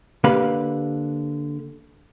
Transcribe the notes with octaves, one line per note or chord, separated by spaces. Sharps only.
D3 A#3 G4 B4 F5 B5